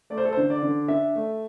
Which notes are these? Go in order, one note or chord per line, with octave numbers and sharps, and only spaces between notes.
A3 D5
C5
A4
D3 C5
D5
D3
D4 E5
A3